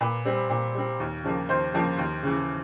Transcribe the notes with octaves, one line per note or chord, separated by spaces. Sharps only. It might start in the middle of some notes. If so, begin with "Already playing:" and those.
A#2 B4
G3 C4
A#2
G3 C4
D#2
C#3 F3 A#3
D#2 C5
C#3 F3 A#3
D#2
C#3 E3